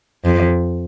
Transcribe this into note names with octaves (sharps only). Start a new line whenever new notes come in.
F2